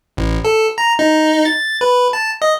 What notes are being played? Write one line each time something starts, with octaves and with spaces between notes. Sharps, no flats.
A1
A4
A#5
D#4
A6
B4
A5
D#5